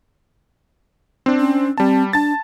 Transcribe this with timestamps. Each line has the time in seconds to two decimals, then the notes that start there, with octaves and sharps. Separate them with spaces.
1.26 C4 D4
1.39 C#4
1.78 G3 C4 A5
2.13 D4 A5 A6